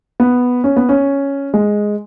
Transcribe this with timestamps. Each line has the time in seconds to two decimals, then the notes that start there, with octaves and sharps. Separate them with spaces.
0.20 B3
0.64 C#4
0.76 B3
0.89 C#4
1.54 G#3